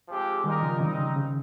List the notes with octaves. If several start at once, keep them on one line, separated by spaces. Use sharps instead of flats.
F3 G#3 C4 G4
A#2 D#3 G3 G#3 D#4 A#4
C#3 F3
C3 D#3 G3 C4 D#4
C#3
C#3